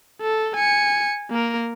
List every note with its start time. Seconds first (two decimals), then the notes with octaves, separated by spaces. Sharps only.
0.22 A4
0.56 G#5 C#7
1.30 A#3 A#4